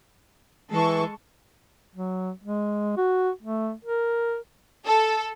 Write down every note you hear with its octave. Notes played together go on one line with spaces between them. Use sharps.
E3 G#3 A4 C#6
F#3
G#3
F#4
A3
A#4
A4